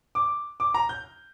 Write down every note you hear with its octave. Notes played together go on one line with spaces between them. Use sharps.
D6
D6
A#5
G6